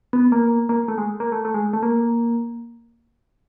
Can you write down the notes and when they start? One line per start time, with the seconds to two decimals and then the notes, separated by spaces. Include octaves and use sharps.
0.13 B3
0.32 A#3
0.69 A#3
0.88 A3
0.98 G#3
1.20 A#3
1.32 A3
1.45 A3
1.54 G#3
1.73 A3
1.83 A#3